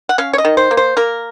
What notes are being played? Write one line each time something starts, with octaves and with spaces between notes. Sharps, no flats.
F#5
C#4 F5
C#5
D#5
D#3
C5
A#3
C5
A#3 A#4